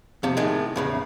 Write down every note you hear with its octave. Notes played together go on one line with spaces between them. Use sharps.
F2 C3
A2 D#3 G#3
E2 A2 C#3